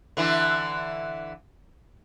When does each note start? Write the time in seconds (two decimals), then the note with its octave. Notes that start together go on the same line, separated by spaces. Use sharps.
0.17 D3 E3 E4